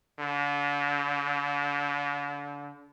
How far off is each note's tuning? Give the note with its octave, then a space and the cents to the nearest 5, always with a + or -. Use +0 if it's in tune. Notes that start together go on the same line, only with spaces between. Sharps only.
D3 -35